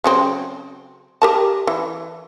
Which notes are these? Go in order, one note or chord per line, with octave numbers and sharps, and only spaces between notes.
C#3 F#3 C4
G4 A#4 A5
E3